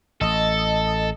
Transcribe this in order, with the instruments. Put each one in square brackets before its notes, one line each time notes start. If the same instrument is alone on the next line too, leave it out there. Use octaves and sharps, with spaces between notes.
[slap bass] A1 [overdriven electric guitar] A4 [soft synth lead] D#5